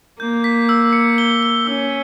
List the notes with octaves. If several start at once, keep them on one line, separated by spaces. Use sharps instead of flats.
A#3 G6
B6
E6
C#7
G7
G7
C#4 E6